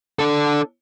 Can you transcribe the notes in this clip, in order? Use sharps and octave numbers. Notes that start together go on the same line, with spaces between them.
D4 A4